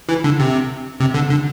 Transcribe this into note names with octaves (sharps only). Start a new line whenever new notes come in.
E3
D3
C3
C3
D3
D3